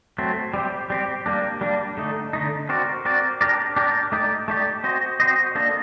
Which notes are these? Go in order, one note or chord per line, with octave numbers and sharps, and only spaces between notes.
F#3 A3 C4
G3 C4 G4
G3 C4 G4
G3 A#3 D4
G3 A#3 D4
D3 A3 D#4
D3 A3 D#4
C4 F#4 A#4 D5
C4 F#4 A#4 D5
D4 G4 A#4 D5
D4 G4 A#4 D5
A3 D#4 G4 D5
A3 D#4 G4 D5
C4 F#4 C5 D#5
C4 F#4 C5 D#5
A#3 D4 A4 D#5